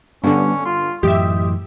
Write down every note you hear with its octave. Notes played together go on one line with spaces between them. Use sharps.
G2 D3 G3 B3 C#4 D4
F4 C6
F#2 A2 E3 G4 D#5 E5